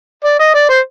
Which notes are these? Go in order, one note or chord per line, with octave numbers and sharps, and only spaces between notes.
D5
D#5
D5
C5